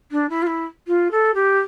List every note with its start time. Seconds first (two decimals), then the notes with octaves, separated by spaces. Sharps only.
0.11 D4
0.29 E4
0.42 F4
0.46 E4
0.87 F4
1.11 A4
1.34 G4